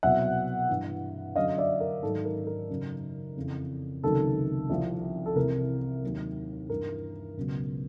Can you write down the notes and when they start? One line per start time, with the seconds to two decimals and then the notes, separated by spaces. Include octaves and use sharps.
0.03 C2 B2 F#3 E5 F#5
0.69 G2 E3
1.36 F#2 D3 F#3 D#5 F5
1.58 D5 E5
1.80 A#4
2.02 G#2 D#3 F#3 A4
2.25 A#4
2.47 A#4
2.70 F#2 C#3 F#3
3.36 F2 C#3 E3
4.04 C#2 C3 D#3 F#3 A4
4.70 C2 C3 F3
5.26 A4
5.36 C2 C3 E3 A#4
6.04 D#2 D#3 F#3
6.69 G2 E3 A#4
7.37 C#2 B2 F#3